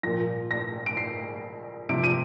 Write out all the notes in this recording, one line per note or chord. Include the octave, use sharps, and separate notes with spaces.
A#2 F3 A#6
A#6
D7
C7
C3 F3 D7
D#7